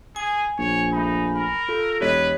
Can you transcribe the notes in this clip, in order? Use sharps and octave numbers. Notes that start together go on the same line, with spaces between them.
G#4 G#5
A#1 C#5
A3 D#4 B5
A#4 B5
F4 A4
E1 G4 B4 C#5 D#5